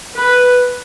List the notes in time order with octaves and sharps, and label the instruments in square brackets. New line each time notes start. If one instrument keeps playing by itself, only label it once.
[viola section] B4